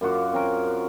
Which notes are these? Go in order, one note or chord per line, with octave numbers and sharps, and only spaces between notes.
F#2 F4 F#4 D6
C4 C#4 A#4